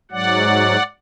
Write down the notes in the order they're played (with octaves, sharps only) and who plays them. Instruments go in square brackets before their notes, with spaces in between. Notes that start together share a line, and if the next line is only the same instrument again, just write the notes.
[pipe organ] G#2 F#3 D5 F#5